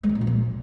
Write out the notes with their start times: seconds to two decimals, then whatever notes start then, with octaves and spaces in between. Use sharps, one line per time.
0.03 G#3
0.09 D#3
0.15 A#2
0.21 F3
0.27 A#2